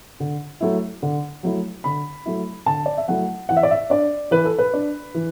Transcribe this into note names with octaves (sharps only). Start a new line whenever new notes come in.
D3
F#3 A3 E4
D3
F#3 A3 E4
D3 B5
F#3 A3 E4
D3 A5
D5
E5
F#3 A3 E4 F#5
E3 F#5
E5
D5
E5
D4 D5
E3 B4
A4
B4
D4
E3